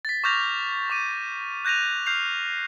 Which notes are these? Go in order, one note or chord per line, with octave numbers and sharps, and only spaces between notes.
A6 B6
C#6 D6 F6 G6 A#6 F7
C#6 D6 D#7
F#6 G6 A#6 D#7 F7
F6 G6 C7 F7